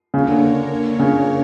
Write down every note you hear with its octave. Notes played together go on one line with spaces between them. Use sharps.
C#3 A#3 D4 A#4 C#5
D3
C#3